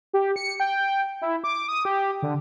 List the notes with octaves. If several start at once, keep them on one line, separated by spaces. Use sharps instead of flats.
G4
C#7
G5
E4
D6
D#6
G4
D3